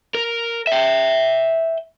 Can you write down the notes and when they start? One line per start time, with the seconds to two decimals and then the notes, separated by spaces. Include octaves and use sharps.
0.15 A#4
0.67 E5 G5